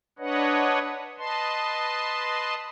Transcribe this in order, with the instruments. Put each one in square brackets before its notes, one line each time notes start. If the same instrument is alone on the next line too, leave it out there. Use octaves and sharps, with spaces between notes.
[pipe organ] D4 B4 C#5 D#5 F#5
B4 D#5 A5 C6